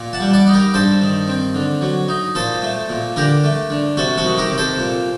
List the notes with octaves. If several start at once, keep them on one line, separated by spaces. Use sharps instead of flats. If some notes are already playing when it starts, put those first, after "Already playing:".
Already playing: A#2
F#5 A5
G3
D5 F#5
D#4
G4 A#4
G2 A4 C5
D#3
C4
D3
F#3
D#4
A#2 A4 C5
A3
A#2
D3 G4 A#4
A3
D3
C3 F#4 A4
F#4 A4
D#3
G4 A#4
C3
A4 C5
A#2